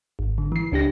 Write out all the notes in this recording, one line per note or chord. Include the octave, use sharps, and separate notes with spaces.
G#1
D3
E3 C7
C#2 D4 G4 A#6